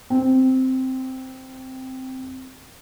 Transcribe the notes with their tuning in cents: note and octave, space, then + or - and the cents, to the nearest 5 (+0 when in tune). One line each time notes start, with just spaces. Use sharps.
C4 -5